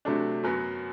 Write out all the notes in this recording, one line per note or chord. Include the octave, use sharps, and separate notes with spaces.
C3 F#3 A3 D4
F#2 F#3 B3